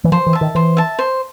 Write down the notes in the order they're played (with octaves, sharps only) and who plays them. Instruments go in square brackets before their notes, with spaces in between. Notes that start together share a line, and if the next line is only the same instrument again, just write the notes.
[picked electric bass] E3
[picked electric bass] F3 [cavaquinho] C5
[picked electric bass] E3
[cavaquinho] E5 A5
[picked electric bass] D#3
[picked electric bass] E3 [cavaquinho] C5
[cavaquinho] E5 A5
C5